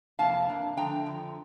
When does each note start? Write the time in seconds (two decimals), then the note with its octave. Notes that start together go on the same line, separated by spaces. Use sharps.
0.19 F2 C3 E3 A#3 F5 A5
0.48 G2 E3 A#3 D4
0.77 D3 F3 A3 D4 G5 A#5
1.06 F2 D3 F3